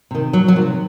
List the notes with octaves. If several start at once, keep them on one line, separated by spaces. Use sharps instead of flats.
C3 D#3
F#3
F#3
C3 D#3